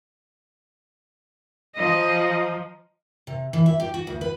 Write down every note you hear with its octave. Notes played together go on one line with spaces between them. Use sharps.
F3 D#5 A#5 D#6
C3
E3
E5
G4
F#4
D2
B4